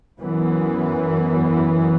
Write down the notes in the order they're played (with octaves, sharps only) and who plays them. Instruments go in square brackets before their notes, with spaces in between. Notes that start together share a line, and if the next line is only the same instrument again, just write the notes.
[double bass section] F#2 E3 B3